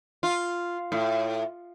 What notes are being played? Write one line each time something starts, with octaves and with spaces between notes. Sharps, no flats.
F4
A2